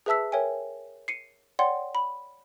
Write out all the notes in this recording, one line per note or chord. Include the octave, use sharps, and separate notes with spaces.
G#4 B4 E5 A5 E6 B6
A#4 C#5 E5 G5 G#5
C7 C#7 D#7
C#5 D5 F#5 G5 C6
B5